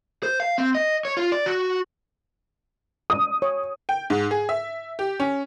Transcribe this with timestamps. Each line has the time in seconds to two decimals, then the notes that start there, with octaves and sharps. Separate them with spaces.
0.23 C5
0.40 F5
0.58 C4
0.75 D#5
1.05 C#5
1.17 F4
1.32 D5
1.46 F#4
3.10 D#6
3.42 C#5
3.89 G5
4.10 G#2
4.31 G#4
4.49 E5
4.99 G4
5.20 C#4